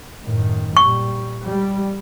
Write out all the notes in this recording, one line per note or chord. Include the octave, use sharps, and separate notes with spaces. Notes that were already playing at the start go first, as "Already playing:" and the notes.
F#2 A2 D#3
A#2 G3 C#6
G3